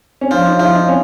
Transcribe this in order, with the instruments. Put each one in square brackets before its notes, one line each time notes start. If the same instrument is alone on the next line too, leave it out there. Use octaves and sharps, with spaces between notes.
[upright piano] C#4
[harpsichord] F3 [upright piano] D4
[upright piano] D#4
[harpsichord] F3 [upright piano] E4
[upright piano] D#4
C#4